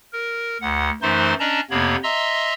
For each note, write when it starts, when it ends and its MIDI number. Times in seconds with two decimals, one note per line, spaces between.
0.13 0.57 70
0.61 0.90 38
0.61 0.90 78
1.02 1.34 42
1.02 1.34 52
1.02 1.34 57
1.02 1.34 63
1.02 1.34 72
1.02 1.34 84
1.40 1.60 61
1.40 1.60 62
1.40 1.60 74
1.40 1.60 75
1.40 1.60 81
1.40 1.60 82
1.71 1.96 41
1.71 1.96 48
1.71 1.96 58
1.71 1.96 59
1.71 1.96 73
1.71 1.96 83
2.03 2.54 75
2.03 2.54 76
2.03 2.54 82
2.03 2.54 84
2.03 2.54 88